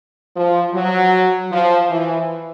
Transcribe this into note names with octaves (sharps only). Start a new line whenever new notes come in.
F3
F#3
F3
E3